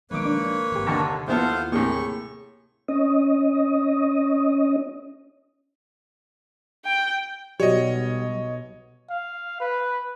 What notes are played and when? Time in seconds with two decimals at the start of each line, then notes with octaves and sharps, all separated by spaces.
0.11 B1 D#3 F3 G#3 A#3 B4 C#5 D6
0.25 D4
0.71 G#1 G2 C3 G4
0.87 D#2 D3 A5 A#5 C#6
1.28 D#2 F3 B3 E4 F4 A4 C5 F5
1.72 A2 C3 A#3 G#4 C#6
2.88 C#4 D#5
6.85 G5
7.60 B1 F#3 G3 C#5 D#5
9.10 F5
9.60 B4